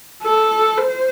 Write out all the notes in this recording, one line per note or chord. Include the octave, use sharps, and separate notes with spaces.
A4
C5